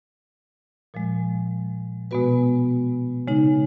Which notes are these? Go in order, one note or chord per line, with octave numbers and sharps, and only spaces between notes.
A#2 F3 G#3
B2 G#3 B3 F#4 B4
C#3 G#3 D#4